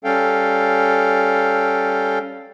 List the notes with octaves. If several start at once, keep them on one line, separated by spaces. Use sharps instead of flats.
G3 C#4 A4 F5 G5